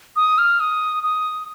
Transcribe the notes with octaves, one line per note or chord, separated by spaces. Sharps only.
D#6
F6
D#6
D#6